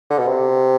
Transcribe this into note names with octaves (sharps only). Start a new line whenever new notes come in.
D3
B2
C3